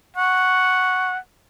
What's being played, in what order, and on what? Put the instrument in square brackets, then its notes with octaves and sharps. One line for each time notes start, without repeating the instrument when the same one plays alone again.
[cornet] F#5 [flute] C#6